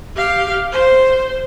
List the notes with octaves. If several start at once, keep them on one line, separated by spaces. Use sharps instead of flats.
G4 F5
C5